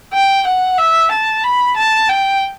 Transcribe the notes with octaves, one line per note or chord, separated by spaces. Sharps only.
G5
F#5
E5
A5
B5
A5
G5